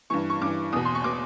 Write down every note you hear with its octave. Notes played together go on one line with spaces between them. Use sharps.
G2 E3 C#6
C#6
G2 E3 D6
E2 B2 D#6
C6
C#6
B2 D6